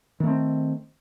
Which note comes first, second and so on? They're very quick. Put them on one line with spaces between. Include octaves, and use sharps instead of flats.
D#3 A3 C4